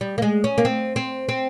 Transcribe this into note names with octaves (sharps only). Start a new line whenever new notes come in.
G3
A#3
G#3
C#4
A#3
C4
C4
C4